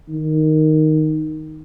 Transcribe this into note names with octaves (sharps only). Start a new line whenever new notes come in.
D#3